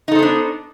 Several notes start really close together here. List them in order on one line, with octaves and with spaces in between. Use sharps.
D#4 A4 C5 B3 D4